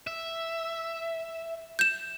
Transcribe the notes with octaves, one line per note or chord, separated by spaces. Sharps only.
E5
G6 E7